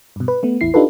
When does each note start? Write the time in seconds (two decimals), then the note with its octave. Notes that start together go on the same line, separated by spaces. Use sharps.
0.16 G2 B2
0.28 B4
0.43 A3 B3
0.61 A1 E2 E4 C7
0.74 D4 D#4 F4 G4 A4 B4